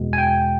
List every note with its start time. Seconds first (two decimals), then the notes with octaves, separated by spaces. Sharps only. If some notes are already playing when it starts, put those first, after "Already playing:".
Already playing: E2 B2 G#3
0.13 G#5
0.18 G5